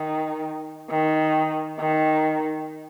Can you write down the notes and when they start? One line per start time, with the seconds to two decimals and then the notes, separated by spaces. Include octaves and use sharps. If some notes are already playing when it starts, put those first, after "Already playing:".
Already playing: D#3
0.90 D#3
1.79 D#3